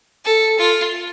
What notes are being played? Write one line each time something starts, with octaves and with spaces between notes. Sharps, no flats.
A4
F4